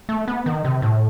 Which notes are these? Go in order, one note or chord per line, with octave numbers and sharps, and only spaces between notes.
A3
B3
D#3
C3
A2